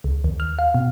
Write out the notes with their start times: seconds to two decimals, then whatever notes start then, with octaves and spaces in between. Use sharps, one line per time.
0.04 C#2
0.24 D#2
0.40 F6
0.59 F5
0.75 B2